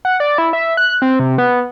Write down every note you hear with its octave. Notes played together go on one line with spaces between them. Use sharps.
F#5
D5
E4
E5
F#6
C4
C3
B3